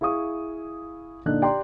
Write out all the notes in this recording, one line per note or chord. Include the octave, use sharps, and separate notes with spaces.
E4 G#4 F5 C#6 D#6
A#2 D3 D4 D#4 F#6
G4 D5 G5 A#5 C6